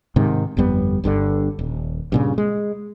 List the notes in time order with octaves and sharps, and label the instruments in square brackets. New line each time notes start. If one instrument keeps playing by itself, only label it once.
[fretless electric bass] G#2 C3 D#3
G1 F2 G3 B3
G1 G2 B2 D3
D#1
G2 A#2 C#3
G#3